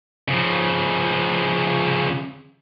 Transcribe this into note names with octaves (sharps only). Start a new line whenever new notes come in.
C#3 F3